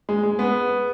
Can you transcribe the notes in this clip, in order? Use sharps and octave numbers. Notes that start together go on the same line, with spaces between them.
G#3
G#3
B3